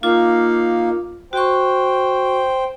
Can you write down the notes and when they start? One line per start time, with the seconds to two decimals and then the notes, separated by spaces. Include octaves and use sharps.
0.03 A#3 D#4 F4 F5 D6
1.33 F#4 C5 G5 C#6